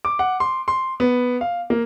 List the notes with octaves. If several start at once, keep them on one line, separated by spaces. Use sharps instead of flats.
D6
F#5
C6
C6
B3
F5
A#3